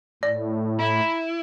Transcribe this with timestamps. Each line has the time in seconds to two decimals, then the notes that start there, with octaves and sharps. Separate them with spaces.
0.23 A2 D5
0.79 E4 B5